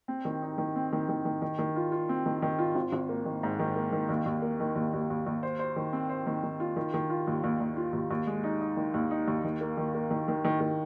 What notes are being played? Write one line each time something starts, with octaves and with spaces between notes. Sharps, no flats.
C4
D#3
D#4
D#3
C4
D#3
D#3
D#3
D#3
D#3
F4
F4
C4
D#3
D#3
F4
G#1
G#1
A#3
D#3
G#2
D#3
A#3
D#3
D#2
D#2
A#3
D#3
D#2
D#2
D#2
D#2
C5
C5
D#3
C4
C5
D#3
D#3
F4
D#3
D#3
F4
D#2
D#2
D#2
F4
D#2
D#2
G#3
D#4
D#4
D#3
D#2
D#4
D#2
D#3
A#3
D#3
A#3
D#3
D#3
D#3
D#3